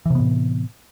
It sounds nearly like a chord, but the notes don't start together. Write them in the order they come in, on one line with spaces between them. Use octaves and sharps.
E3 C3 B3 A2